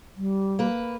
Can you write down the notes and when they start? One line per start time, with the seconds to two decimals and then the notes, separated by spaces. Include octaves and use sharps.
0.17 G3
0.59 A#3 B4